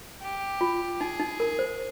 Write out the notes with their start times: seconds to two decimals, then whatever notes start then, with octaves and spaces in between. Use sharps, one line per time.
0.21 G4
0.61 F4
1.00 D#4 G#4
1.20 D#4
1.40 A#4
1.59 C5